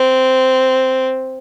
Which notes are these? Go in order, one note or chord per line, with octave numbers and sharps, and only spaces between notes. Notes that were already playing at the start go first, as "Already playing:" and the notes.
Already playing: C4